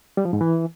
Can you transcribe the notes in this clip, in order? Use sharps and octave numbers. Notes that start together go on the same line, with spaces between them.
G3
F3
G#2
E3